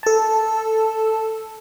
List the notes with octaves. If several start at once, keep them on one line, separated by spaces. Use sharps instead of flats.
A4 A5